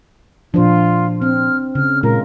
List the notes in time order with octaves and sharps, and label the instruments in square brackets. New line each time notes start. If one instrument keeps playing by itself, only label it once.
[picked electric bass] A#2 F3 [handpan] D4 C5 [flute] F4
[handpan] C4 [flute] F6
[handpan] C#3 [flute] F6
[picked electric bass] A#2 [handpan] G#3 F4 [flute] A#4